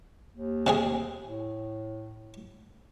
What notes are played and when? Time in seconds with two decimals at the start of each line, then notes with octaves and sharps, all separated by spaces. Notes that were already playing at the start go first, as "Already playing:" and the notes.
0.31 D#2
0.67 C3 C4 G#4
1.25 A2